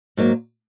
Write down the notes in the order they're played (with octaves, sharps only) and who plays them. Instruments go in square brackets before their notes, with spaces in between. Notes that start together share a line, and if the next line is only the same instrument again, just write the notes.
[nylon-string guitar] G#2 F#3 A#3